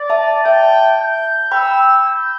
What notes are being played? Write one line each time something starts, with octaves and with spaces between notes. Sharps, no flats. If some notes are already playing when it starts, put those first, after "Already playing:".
Already playing: D5
E5 A5
E5 G5 A5
G6
G5 B5 E6
G6